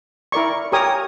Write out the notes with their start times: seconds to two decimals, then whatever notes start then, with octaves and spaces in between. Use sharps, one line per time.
0.32 E4 A#4 D5 C#6
0.72 G4 A#4 C#5 G#5 D#6